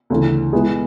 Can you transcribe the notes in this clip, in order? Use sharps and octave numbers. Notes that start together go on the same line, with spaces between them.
D2 C#3 E3
B2 G#3 B3 E4 G#4